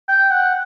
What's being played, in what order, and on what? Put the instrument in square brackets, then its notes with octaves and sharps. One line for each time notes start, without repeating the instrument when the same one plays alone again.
[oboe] G5
F#5